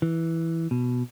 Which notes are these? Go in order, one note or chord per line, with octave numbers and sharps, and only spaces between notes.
E3
B2